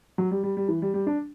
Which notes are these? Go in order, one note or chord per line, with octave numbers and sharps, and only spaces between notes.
F#3
G3
G3
G3
E3
G3
G3
D4